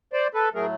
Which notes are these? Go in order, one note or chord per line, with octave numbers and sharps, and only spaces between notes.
C5 D5
A4 B4
A2 F#3 A3 G#4 A#4